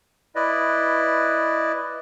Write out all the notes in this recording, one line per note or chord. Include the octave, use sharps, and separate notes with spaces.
E4 B4 D5 D#5